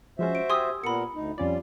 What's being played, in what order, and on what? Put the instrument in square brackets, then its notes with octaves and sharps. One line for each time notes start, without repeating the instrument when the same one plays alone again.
[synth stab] F3 G#3 C#4 [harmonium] F#4 C5 E5
[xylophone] D7
[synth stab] G4 G#5 [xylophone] C6 D#6 E6
[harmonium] A#2 B3 A#4 [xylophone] B5 C#7
[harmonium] D2 D#4
[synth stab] F2 C#4 D5 [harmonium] G3 F4